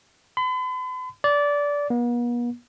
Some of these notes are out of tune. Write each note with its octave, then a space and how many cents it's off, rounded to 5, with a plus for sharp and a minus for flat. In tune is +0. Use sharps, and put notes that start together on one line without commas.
B5 +45
D5 -20
B3 -45